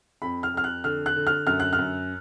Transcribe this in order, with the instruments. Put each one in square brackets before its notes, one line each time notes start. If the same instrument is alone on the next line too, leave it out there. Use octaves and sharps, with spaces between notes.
[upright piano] F2 B5
F6
F2 F6
F#6
D3 F6
F#6
D3
F6
F#2 F6
F#6
F6
F#2